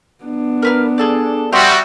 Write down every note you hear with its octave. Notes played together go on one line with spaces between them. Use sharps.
B3 D4
A#4 B4 F6
G#4 A4 D5
G3 F#4 G4 C5 D#5 E5